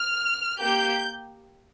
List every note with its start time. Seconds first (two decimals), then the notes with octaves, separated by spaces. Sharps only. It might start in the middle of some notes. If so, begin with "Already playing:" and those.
Already playing: F6
0.60 A#3 G4 G6